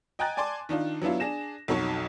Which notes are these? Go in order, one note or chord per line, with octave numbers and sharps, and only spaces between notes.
D#5 G5 G#5 A#5 F#6 A6
D5 G#5 A5 C6 D6
D#3 D4 D#4 F4
F#3 B3 D4 E4 F4
D4 G#4 A#6 E7
B1 F2 F#3 D#4 C#5